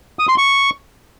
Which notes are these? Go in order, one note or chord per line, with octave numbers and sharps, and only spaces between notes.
D#6
C6
C#6